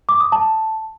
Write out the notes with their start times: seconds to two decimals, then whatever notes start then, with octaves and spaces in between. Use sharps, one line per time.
0.09 D6
0.20 D#6
0.32 A5